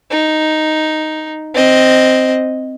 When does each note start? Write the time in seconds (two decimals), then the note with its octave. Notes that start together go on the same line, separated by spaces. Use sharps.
0.11 D#4
1.55 C4 D#5